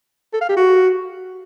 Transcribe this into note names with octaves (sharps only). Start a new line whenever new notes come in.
A4
F5
G4
F#4